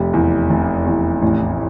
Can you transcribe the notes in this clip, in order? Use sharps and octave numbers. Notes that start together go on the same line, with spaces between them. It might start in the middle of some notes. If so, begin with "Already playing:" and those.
Already playing: F1 G4
E2
F1
E2
A1